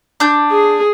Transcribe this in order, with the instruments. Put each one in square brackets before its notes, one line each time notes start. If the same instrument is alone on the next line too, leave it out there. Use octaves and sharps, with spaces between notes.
[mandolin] D4 G6
[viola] G#4